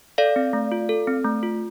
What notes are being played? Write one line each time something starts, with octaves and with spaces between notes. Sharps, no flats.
A4 D5 F5
C4
A3
F4
A4
C4
A3
F4